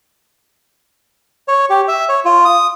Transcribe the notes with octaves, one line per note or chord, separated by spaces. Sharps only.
C#5
G4
E5
C#5
F4
D#6